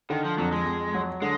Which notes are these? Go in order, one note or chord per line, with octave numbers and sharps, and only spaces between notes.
D3 D#3
F3
F2 F#3
G#3
F2
F#3
D3 G#3